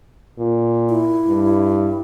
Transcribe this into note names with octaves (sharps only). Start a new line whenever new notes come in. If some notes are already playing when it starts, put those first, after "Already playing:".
A#2
E4
G2